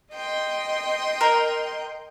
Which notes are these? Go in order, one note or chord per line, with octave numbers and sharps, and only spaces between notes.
D#5 G5 C6
A#4